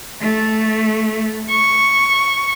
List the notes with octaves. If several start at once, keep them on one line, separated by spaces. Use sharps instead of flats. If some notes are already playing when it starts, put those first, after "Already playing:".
A3
C#6